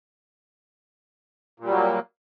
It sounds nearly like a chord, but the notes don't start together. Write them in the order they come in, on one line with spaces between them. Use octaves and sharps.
A#2 G3 F#3 A#3